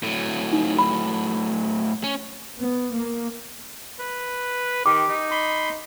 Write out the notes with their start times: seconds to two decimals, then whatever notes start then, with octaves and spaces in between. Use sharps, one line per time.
0.03 A2 F#3
0.53 D#4
0.79 B5
2.04 C#4
2.58 B3
2.92 A#3
3.99 B4
4.86 D#3 G4 D6
5.09 D#4
5.31 B5 C6